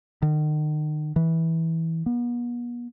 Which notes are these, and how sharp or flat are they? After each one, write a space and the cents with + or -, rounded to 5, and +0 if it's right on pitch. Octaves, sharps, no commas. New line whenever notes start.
D#3 -40
E3 -15
B3 -40